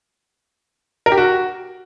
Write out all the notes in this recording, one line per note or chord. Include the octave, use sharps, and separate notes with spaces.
A#4
G4
F#4